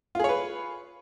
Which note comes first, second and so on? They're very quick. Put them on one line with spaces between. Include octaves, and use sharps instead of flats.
F4 G#4 C#5 B4